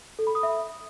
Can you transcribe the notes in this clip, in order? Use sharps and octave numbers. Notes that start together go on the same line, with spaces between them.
A4
B5
D#6
E5